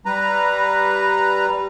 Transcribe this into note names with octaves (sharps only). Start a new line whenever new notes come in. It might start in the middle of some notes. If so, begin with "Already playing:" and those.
G3 B4 A#5